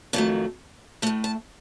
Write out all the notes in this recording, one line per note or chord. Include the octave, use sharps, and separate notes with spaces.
F2 D#3 F#3 A3 A5
A2 A3 A5
A5